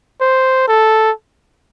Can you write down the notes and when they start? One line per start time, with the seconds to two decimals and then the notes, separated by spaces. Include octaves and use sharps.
0.21 C5
0.68 A4